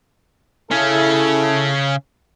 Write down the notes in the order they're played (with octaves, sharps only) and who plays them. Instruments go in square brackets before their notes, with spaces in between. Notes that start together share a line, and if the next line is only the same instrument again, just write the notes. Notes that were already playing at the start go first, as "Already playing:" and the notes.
[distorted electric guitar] C#3 C#4 [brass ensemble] E4 A4